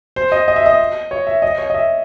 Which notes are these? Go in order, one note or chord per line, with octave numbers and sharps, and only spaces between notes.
C5
D#5
D#5
E5
D#5
C#5
E5
D#5
C#5
D#5
E5